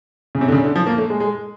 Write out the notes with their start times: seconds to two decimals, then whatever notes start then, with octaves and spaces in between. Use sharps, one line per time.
0.35 C#3
0.41 C3
0.48 D3
0.52 C#3
0.64 D3
0.76 F3
0.87 A#3
0.98 A3
1.10 G#3
1.20 G#3